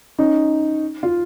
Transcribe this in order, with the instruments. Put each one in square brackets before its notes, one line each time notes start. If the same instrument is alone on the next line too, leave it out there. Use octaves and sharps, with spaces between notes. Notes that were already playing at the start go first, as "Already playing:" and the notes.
[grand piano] C#4 D#4
F4